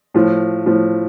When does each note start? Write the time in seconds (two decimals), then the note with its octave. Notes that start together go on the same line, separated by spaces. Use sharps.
0.14 A2 F3
0.66 A2 F3